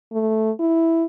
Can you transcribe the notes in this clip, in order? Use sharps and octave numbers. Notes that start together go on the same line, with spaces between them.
A3
E4